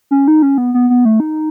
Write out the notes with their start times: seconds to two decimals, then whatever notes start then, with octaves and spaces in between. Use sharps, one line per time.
0.11 C#4
0.28 D#4
0.42 C#4
0.58 B3
0.74 B3
0.90 B3
1.05 A3
1.20 D#4